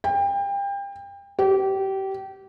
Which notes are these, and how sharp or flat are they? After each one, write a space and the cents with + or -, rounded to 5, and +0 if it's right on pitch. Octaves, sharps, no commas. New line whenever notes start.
G5 +30
G4 -25